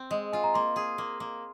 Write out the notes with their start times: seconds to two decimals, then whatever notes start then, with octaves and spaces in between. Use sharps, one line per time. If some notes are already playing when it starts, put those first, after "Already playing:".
Already playing: C4
0.11 G#3
0.33 F4 G#5
0.44 A#5
0.54 A#3 C6
0.76 G#4
0.98 A#3
1.20 A#3